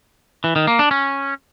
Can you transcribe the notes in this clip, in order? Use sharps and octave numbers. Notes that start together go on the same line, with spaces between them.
E3
D#3
A#3
D4
C#4